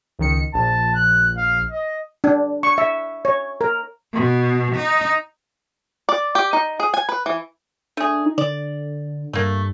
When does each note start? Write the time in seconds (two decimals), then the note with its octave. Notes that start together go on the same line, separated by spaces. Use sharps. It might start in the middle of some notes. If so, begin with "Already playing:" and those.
0.19 C#2 D#3 C#7
0.54 A#1 A5
0.94 F#6
1.37 F5
1.71 D#5
2.24 D4
2.63 C#6
2.78 E5
3.25 C#5
3.61 A#4
4.14 B2
4.76 D#4
6.09 D5
6.35 G4
6.53 D#4
6.80 G#4
6.94 G#5
7.09 B4
7.26 E3
7.97 A3 D4 G#4
8.26 D#4
8.38 D3 D5
9.33 G2 A3 A#3